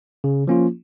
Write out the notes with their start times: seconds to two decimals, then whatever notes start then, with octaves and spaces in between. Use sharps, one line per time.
0.24 C#3
0.47 F3 A#3 C#4 F4